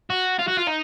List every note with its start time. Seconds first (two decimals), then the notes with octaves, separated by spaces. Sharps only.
0.10 F#4
0.39 F4
0.48 F#4
0.57 F4
0.68 D#4